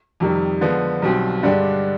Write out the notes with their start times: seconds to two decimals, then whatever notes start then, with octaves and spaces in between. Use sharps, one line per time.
0.20 F2 C3 D#3 G3
0.61 D3 F3 G#3 B3
1.02 B1 B2 G3 C4
1.43 G2 D3 G#3 D4 G4